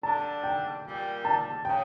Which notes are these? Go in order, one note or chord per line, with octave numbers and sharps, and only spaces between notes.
D3 G3 D4 A5
G5
A#2 G3 A#3
A5
C#3 G5